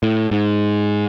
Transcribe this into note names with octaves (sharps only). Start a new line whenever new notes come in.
A2
G#2